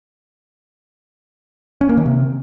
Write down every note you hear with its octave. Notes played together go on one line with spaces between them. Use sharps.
C#4
A#3
D#3
C3